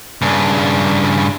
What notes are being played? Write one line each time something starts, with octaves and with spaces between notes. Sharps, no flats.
G2 C#3